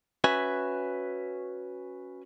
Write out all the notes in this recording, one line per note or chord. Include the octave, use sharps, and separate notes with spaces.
C#4 F#4 B4 E5 G#5